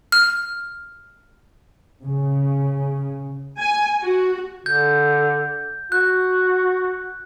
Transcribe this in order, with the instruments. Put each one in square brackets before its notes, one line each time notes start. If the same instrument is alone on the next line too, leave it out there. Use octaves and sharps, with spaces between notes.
[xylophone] F6
[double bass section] C#3
[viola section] G#5
F#4
[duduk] D3 [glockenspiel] G6
[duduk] F#4 [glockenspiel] F#6